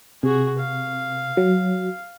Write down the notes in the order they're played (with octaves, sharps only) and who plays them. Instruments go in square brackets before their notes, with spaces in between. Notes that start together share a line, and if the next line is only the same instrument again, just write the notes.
[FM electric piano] C3 [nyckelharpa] F#4 G#4
[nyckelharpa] F5
[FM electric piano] F#3